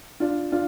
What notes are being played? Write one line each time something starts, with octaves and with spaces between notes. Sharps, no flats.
D4 F4
D4 F4